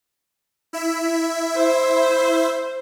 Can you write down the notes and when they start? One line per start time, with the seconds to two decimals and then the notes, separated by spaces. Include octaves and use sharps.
0.73 E4 E5
1.55 C5